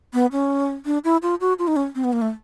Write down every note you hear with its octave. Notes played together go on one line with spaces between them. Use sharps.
B3
C#4
D4
E4
F4
F#4
F4
D#4
C#4
C4
B3
A#3
A3